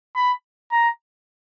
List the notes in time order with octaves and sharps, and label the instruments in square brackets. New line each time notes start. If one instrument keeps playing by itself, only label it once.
[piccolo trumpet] B5
A#5